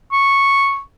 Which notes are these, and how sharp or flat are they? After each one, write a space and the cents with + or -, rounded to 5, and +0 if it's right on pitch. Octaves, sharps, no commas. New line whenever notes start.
C#6 -5